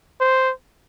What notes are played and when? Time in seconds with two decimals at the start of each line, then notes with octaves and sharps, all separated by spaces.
0.21 C5